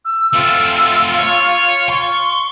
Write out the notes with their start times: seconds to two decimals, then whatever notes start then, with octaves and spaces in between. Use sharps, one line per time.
0.05 E6
0.34 A3 C4 F4
1.18 C#5
1.89 C6 C#6